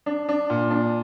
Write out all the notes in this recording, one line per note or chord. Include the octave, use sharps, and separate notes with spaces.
D4
D4
A#2
D4